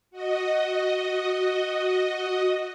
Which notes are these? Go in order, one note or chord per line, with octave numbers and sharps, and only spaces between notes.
F#4 D#5